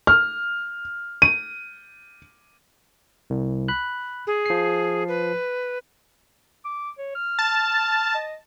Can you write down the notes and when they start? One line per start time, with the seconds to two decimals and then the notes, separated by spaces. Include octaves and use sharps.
0.07 F6
1.22 D#7
3.30 C2
3.68 B5 F#6
4.27 G#4
4.46 F3 C7
5.08 B4
6.64 D6
6.98 C#5
7.15 F6
7.39 A5
8.15 D#5